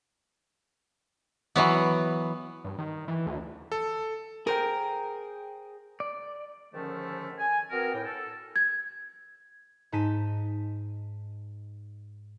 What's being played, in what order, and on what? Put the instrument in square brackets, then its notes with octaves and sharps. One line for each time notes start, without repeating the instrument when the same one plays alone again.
[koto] E3 F#3 B3
[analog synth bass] G2
D#3
E3
D2
[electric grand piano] A4
[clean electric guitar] G#4 C5 G5 [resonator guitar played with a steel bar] A#4
[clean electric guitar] D5
[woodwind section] G#2 D3 D#3 F3 A3 C#4
G#5
B3 C4 F#4 A#4
A2 G5
A4
[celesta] G#6
[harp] G#2 D#4 A5 B6 D#7